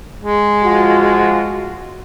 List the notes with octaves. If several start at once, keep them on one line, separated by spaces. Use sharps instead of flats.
G#3
F3 F4 F#4